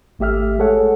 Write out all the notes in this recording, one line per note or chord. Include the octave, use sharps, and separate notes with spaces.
G#1 A3 G4 E5 F6
G#3 G#4 A4 C#5 F#5